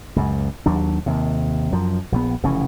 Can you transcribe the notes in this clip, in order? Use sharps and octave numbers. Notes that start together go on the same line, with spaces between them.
C#2 F#2
D#2 F#3 D4
D#2 C3
F#2 F3
A#1 D3 B3
F1 C#3 E3 C#4